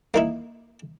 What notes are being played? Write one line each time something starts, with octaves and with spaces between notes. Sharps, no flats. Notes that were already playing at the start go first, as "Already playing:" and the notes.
A#3 D#4 E4